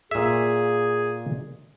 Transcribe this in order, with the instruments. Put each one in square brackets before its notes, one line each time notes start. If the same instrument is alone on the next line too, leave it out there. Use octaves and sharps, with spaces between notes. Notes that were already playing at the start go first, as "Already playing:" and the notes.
[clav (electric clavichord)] A#2 E5 [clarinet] G#4